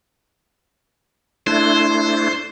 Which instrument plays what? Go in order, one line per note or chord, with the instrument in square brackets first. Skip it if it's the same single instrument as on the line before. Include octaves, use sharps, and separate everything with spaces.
[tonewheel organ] A3 D4 E4 [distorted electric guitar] C5